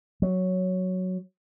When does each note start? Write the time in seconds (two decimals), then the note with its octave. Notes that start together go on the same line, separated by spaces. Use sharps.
0.22 F#3